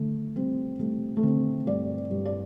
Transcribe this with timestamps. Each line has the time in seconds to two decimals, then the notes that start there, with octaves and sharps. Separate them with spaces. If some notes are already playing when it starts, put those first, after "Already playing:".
Already playing: D3 A3
0.36 G3 C4
0.79 G3 A3
1.17 A3
1.23 D3 C4
1.66 G2 D5
2.10 G2
2.25 D5